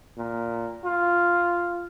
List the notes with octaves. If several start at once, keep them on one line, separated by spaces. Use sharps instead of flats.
A#2
F4